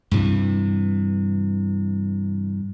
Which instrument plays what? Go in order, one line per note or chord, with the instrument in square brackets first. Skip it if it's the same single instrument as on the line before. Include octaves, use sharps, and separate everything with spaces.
[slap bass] G2 C3 E3